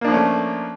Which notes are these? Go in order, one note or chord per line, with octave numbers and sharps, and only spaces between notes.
F3 A3 A#3 C#4 D4